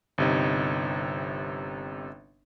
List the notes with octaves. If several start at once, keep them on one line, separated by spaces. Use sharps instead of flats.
G1 C3 D#4